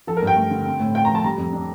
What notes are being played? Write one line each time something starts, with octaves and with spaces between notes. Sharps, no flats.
F3 A4
A#4
G2 G5
A3
D3
C4
A2
F4 G5
A#5
F3
A5
G3 A#5
F2
D4